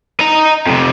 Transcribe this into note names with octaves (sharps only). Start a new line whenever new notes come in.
D#5 A#5
F2 C3